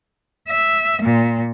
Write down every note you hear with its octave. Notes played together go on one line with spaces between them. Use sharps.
E5
A#2